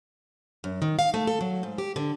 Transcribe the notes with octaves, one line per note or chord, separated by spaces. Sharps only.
F#2
D#3
F5
A3
A4
F#3
G#2
G4
D3